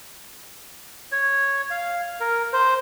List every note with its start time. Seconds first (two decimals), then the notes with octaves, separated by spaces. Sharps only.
1.12 C#5
1.71 F5
2.20 A#4
2.53 C5